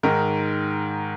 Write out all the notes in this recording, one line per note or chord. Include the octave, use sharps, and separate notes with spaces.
G#2 D#3 A#4